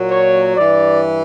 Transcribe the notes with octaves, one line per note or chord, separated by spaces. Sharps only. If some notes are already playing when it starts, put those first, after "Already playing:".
Already playing: A#2 F#3
C#5
G2 E3 D5